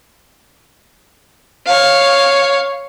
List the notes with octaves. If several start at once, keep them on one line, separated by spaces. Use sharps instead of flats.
C#5 F5